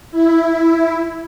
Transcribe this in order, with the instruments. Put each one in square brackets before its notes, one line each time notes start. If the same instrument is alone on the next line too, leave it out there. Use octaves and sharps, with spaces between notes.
[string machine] E4